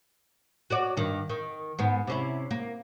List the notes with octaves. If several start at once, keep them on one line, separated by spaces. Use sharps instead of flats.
F#4 C#5 D5
G2 D#3
D#3
G#2 B3
C3 C#4 E4
A#3